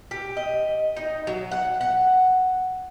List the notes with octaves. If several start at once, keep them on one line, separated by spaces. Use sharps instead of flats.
G4
D#5
D#4
F#3
F#5
F#5